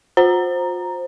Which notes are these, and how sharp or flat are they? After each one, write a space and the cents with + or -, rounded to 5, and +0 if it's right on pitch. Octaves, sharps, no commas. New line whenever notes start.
F4 +40 C5 +10 A#5 +0